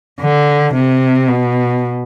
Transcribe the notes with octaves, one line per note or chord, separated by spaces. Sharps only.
D3
C3
B2